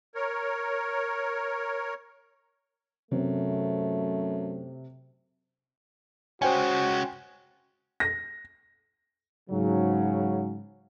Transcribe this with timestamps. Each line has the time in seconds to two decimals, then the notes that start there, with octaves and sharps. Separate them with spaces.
0.15 A#4 C#5
3.11 F#2 C3 A3
6.42 G#3 C#4 F#4 C5 G5 G#5
8.00 A#6
9.50 G#2 C#3 F#3